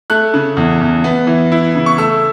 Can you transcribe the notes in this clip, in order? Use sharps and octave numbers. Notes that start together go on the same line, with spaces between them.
A3 F#6
C#3
E2
E2
B3
E3
E4
C#3
C#6
A3 E6